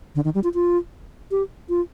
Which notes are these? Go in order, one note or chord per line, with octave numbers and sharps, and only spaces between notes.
D3
D#3
G3
F4
F4
G4
F4